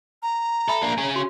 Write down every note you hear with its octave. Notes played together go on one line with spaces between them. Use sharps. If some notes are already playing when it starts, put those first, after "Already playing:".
A#5
A4 E5 B5
A#3 D4
C#4 G#4
F#4